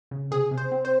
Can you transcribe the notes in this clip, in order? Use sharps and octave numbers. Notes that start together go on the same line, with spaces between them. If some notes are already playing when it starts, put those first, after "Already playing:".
C#3
C3 G#4
C3
C5
C4
C5